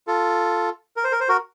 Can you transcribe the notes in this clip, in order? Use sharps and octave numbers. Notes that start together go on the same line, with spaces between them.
F4 A4
A#4
C5
A#4
C5
F#4 A#4